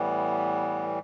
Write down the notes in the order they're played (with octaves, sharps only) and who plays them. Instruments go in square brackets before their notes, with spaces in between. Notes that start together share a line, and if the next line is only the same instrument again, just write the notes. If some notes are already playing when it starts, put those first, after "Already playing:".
Already playing: [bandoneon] A2 E3 G3 B3